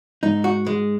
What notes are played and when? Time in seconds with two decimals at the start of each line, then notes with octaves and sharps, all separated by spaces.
0.23 G#2 D#4
0.44 F#4
0.66 G#3